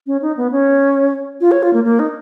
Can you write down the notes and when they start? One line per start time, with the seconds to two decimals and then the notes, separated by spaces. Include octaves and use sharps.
0.07 C#4
0.22 D#4
0.37 B3
0.52 C#4
1.41 F4
1.51 C#5
1.63 F4
1.74 A#3
1.84 A#3
1.99 D#4